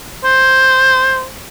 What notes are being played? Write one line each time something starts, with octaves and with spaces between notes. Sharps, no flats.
C5